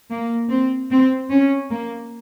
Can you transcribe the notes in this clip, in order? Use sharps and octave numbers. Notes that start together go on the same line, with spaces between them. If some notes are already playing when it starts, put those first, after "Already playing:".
A#3
C4
C4
C#4
A#3